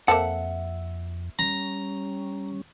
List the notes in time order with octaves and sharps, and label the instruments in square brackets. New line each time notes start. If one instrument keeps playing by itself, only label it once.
[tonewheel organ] F2 [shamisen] A#3 C4 A4 [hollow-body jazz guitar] E5 F#5
[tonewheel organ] G3 C#4 [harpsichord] A#5